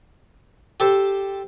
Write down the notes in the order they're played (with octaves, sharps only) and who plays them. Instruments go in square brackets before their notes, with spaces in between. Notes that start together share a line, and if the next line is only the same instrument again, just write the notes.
[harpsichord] G4 A4 C5